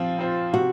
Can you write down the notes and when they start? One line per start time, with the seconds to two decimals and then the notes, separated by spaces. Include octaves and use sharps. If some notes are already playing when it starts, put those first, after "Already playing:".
Already playing: F3 C4 F4
0.19 C4 F4 C5
0.53 C3 F#4